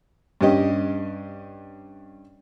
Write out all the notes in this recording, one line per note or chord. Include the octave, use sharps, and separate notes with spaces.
G2 C#4 G4 D#5